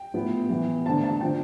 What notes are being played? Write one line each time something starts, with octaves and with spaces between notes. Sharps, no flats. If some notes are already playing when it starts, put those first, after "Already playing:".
Already playing: G5
A2 F3 B3
E3 B3
D3 A3 C4 A5
A5
D3 F3 C4 G5